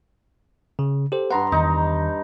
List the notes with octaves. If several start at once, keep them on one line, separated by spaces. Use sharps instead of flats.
C#3
G4 A4 C5
G2 B4 F#5 A#5 C6
E2 D#3 D#4